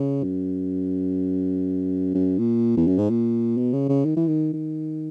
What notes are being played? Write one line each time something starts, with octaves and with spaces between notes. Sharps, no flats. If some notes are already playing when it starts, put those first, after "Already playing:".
Already playing: C#3
F#2
F#2
A#2
E2
F#2
G#2
A#2
B2
C#3
C#3
D#3
E3
D#3
D#3